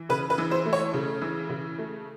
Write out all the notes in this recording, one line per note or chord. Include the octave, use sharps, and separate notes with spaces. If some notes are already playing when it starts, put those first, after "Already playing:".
Already playing: E3
C#3 B4
B4
E3
C5
A3
C#5
C#3
E3
C#3
A3